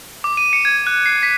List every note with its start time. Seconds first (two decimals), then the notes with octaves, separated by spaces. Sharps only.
0.24 D6
0.37 D#7
0.53 C#7
0.65 G#6
0.87 F#6
1.06 C7
1.23 B6